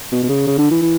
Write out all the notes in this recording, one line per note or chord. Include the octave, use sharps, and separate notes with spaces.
B2
B2
C#3
C#3
D3
E3
E3